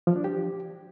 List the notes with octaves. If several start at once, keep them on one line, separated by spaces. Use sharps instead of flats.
F3
D4
G4